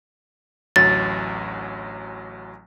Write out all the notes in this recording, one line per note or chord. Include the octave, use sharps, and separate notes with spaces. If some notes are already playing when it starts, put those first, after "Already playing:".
A1 D2 F#3 A6